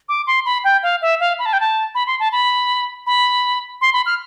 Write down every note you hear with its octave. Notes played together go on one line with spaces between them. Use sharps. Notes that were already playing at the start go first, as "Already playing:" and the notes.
D6
C6
B5
G5
F5
E5
F5
B5
A5
G5
A5
B5
C6
A5
B5
B5
C6
B5
F6